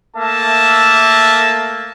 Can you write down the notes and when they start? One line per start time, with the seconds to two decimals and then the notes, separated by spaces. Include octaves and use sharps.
0.17 A3 A#3 E5 A5